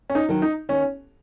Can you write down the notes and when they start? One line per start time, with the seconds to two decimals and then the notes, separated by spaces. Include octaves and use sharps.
0.10 C#4
0.15 D#4
0.29 D#3 F#3
0.42 D#4
0.69 D#2 C#4